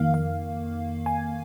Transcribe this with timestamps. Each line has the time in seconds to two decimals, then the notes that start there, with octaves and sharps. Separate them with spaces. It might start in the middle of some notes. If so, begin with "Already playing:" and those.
Already playing: F2 D#3 A#3 F5
0.14 F5
1.06 G#5